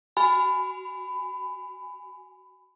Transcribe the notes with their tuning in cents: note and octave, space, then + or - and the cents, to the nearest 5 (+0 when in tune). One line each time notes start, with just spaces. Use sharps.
F#4 +20 G#5 +0 B5 +20